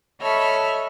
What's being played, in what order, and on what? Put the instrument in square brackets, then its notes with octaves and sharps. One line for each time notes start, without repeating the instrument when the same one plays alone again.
[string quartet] A4 C#5 D#5 E5 B5 F6